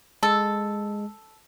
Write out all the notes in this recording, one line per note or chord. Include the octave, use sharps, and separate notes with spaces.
G#3 A4